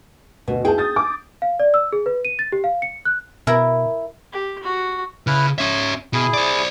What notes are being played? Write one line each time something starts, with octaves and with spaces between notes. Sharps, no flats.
D2 B2
E4 G#4 B4 G5 A5
D#6 G6 A6
D6
F5
D5
E6
G#4
B4
D#7
A6
G4
F5
C#7
F#6
B2 E4 A#4
G4
F#4
C#3 E4 B4 F6
C#4 C#5 E5
B2 E4 G#4
C5 D5